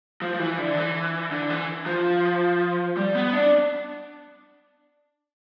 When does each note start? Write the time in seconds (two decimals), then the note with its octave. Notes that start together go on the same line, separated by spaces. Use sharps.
0.22 F3
0.34 F3
0.40 E3
0.58 D3
0.77 E3
1.31 D3
1.50 E3
1.86 F3
2.97 G3
3.15 B3
3.33 D4